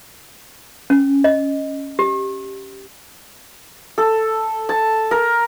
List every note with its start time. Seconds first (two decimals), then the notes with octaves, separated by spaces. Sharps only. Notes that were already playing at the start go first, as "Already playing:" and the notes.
0.90 C#4
1.24 D#5
1.99 G4
3.98 A4
4.69 A5
5.11 A#4